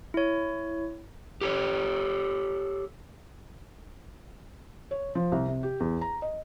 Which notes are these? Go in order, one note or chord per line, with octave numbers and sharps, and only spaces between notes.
E4 C#5
G4 A4 C#5
C#5
F3
C2
C3
G4
E2
A#5
D#5